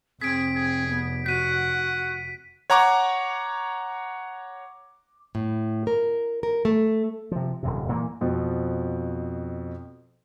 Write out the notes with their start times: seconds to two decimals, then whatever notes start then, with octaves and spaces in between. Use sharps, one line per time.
0.21 F1 C4 G#4 B6 D7
0.55 G#4
0.89 B3
1.26 F#4 F#5 B6 D#7
2.70 C#5 F#5 A#5 C#6 D6
5.35 A2
5.87 A#4
6.43 A#4
6.65 A3
7.31 C3 F3
7.63 D#1 F#2 C3
7.89 A#2 E3 F#3 A#3
8.21 F2 B2 F3 C4